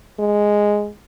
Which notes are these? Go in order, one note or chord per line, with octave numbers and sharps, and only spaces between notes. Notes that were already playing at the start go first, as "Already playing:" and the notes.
G#3